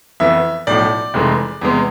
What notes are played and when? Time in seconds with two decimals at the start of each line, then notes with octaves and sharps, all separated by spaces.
0.20 F2 E3 B3 E5
0.67 B1 A2 F3 D5
1.14 F1 F2 E3 G#3
1.62 E2 C3 G#3 B3